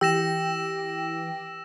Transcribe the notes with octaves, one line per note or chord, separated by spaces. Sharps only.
E3 G4 G5 E6 A#6 E7